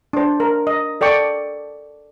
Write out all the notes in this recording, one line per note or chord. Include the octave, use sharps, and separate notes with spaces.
D4 C5
A#4
D#5
A4 D5 G5 C#6